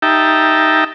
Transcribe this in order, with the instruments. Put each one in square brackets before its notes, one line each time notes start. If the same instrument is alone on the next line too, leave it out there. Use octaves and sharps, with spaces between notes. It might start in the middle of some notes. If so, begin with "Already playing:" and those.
[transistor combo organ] D#4 G4 E5 G5 A5 A#5